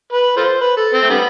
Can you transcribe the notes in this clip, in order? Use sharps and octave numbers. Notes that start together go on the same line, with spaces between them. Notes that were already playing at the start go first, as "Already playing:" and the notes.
B4
F4 A4 C5
B4
A4
C4
A3
D3 G3 B3